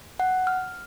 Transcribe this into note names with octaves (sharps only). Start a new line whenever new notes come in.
F#5
F6